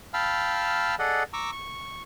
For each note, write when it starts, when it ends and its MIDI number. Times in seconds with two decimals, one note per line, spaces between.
0.14 0.95 77
0.14 0.95 79
0.14 0.95 81
0.14 0.95 83
0.14 0.95 88
0.14 0.95 89
0.99 1.23 68
0.99 1.23 69
0.99 1.23 74
0.99 1.23 75
0.99 1.23 78
1.33 1.51 82
1.33 1.51 85
1.33 1.51 86
1.33 1.51 88
1.52 2.03 85